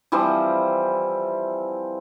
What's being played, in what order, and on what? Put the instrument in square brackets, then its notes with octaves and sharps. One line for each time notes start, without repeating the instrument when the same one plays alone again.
[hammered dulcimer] E3 F3 G3 C4